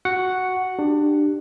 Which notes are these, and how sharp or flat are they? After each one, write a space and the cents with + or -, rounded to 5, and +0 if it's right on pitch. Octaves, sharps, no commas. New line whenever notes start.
F#4 +0 F#5 +0
D4 +20 G4 +0